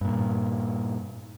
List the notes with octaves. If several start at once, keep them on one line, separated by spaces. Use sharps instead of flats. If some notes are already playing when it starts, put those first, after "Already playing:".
G2 A#2